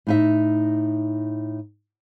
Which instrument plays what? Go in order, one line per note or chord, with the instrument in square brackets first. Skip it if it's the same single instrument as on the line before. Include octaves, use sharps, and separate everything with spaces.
[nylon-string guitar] A2 D#4 E5